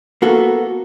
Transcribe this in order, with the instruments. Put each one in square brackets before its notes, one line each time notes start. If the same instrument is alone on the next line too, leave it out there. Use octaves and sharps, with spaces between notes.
[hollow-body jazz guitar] A#3 B3 F#4 A4